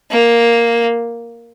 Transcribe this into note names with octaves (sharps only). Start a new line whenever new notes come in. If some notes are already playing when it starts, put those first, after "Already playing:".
A#3